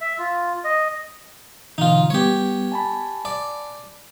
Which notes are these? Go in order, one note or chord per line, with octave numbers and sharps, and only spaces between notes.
E5
F4
D#5
B2 D3 E3 D#4 F4
G3 B3 G4 C#5
G#5 A5 B5
D5